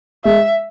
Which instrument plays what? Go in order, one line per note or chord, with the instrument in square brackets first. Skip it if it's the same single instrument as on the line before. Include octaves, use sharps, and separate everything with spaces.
[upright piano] G#3 [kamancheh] E5